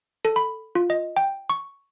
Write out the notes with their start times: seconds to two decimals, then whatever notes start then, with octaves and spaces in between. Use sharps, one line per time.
0.25 A4
0.36 B5
0.75 F4
0.90 D#5
1.17 G5
1.50 C#6